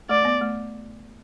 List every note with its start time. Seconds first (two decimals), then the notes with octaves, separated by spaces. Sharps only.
0.09 A3 D5
0.25 B3
0.41 A3